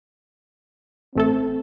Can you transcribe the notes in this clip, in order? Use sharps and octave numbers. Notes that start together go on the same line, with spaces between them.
A1 A3 C4 A4